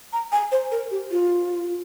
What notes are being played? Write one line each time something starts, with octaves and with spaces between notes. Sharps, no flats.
A#5
G#5
C5
A#4
G4
F4